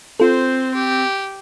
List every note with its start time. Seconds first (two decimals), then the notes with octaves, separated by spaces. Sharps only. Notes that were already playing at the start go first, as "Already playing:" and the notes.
0.20 C4 F4 A4 C5
0.74 G4